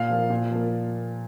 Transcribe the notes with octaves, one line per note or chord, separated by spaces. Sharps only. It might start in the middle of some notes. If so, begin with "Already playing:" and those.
Already playing: A#2 F5
F3 A#3
A#2
F3 A#3